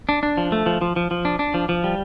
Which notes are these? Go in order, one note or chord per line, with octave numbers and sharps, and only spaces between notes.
D4
D4
F3
A3
F3
F3
F3
F3
D4
D4
F3
F3
G3